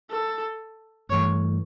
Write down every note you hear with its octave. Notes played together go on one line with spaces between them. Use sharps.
A4
G2 E3 A3 C#5